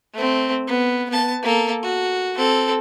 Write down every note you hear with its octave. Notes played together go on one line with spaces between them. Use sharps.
A3 C4
B3
B3 A5
A#3 A4
F#4
C4 A4